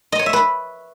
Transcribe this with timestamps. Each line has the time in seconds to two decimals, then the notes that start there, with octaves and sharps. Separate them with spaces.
0.12 D#5
0.19 C#5
0.26 E5
0.33 B4